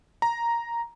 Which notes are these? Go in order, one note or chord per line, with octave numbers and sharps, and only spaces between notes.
A#5